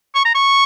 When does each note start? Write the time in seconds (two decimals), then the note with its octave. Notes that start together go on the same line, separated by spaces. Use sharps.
0.15 C#6
0.25 A#5
0.35 C#6